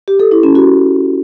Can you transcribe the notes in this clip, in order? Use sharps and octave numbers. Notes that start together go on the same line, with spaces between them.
G4
A4
E4
C#4
F#4